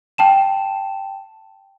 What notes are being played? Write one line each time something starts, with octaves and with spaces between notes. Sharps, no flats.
G5 A5 E7